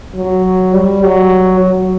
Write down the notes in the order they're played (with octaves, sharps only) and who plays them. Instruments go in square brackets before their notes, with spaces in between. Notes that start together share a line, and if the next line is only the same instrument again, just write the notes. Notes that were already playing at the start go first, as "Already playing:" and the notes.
[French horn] F#3
G3
F#3
F#3